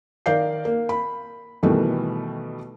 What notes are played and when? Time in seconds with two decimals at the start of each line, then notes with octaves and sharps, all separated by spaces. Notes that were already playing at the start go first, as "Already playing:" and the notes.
0.26 D#3 A#4 D5 F5 G6 C7
0.65 A#3
0.89 B5
1.63 B2 D#3 E3 G3 A3